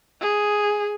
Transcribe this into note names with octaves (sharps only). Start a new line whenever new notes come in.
G#4